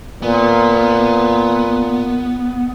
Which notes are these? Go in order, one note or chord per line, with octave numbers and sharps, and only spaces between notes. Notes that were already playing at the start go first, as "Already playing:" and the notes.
A#2 B3